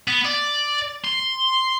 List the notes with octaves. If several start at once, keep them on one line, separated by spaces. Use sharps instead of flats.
B3
D5
C6